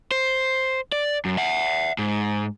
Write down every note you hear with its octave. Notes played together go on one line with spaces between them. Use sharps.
C5
D5
F#2
E5 F#5
G#2